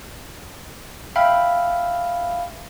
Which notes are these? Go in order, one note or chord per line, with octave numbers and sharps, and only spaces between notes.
E5 F5 G5 B5